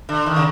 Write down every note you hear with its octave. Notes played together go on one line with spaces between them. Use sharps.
D3
D#3
C#3